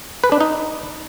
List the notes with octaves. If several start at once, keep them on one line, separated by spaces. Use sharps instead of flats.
B4
D4
D#4